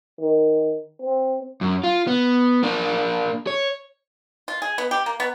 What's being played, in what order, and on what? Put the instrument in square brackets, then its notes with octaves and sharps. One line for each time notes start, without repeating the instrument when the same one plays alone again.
[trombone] D#3
C4
[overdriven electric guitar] F#2
F4
B3
A#3 D4
C#5
[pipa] F4
G#4
B3
G4
A#3
B3